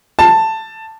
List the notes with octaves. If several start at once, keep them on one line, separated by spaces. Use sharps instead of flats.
A5